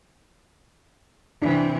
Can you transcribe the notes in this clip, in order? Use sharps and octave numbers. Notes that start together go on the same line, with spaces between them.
C3 E3 D4